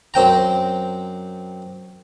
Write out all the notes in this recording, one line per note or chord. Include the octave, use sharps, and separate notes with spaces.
F#2 C4 G5 A#5